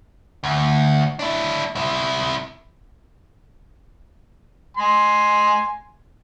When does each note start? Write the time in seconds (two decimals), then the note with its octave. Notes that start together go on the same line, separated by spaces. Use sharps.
0.44 D2
1.19 D4 E4
1.76 C3 E4
4.77 G#5 C6